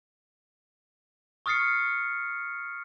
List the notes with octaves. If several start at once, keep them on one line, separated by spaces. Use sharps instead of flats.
C#6 D#6 F6 A6 C7 C#7